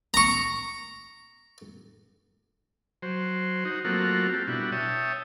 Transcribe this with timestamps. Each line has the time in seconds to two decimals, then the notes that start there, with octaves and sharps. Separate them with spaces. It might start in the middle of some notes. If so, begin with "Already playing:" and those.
0.14 A#5 C#6
3.02 F#3 C5
3.65 D#4 F#4
3.85 F#3 A3 A#3 C4 F4 F#4
4.34 G4 A4
4.47 B2 G3 D4 E4 F#4
4.72 C#5 E5 G5 A5 D#6